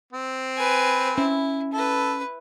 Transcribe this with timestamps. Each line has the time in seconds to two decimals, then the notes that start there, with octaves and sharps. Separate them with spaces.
0.13 C4
0.57 B4 G#5
1.18 C#4 E4
1.73 E4 A4 B4